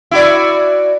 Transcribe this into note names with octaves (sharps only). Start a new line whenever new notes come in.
E4 F#4 D5